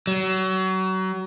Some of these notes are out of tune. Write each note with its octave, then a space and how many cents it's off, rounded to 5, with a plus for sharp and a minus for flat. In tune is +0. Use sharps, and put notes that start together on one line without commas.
F#3 +30